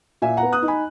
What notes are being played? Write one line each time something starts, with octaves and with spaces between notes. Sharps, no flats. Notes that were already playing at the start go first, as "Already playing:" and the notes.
A#2 E5 G#5
F#5 A#5
B3
D#6 F#6
D#4
G#5 B5